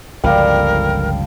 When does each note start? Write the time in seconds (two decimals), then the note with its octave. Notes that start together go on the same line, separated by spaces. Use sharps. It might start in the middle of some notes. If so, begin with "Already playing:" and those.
0.24 G1 C#2 F3 G3 A4 A#4 F5 G5